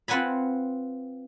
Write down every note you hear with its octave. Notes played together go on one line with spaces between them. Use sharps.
C4 F4 B4 F#5 G#5 B5